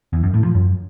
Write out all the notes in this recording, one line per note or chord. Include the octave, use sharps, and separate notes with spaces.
E2
F#2
A2
F3
F#2